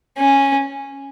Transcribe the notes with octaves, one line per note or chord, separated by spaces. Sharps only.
C#4